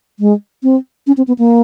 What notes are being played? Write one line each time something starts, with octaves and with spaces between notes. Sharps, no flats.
G#3
C4
C#4
C4
B3
A#3